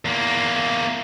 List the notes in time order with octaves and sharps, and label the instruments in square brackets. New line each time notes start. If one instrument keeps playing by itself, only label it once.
[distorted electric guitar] E2 A#3